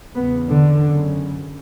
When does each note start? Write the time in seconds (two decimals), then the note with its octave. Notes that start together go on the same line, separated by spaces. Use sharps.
0.15 E2 C#3 B3
0.49 D3
0.82 F#2 C#3